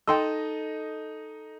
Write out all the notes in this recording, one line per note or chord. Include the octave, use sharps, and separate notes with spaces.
D#4 A4 D#5 G5 C6 E6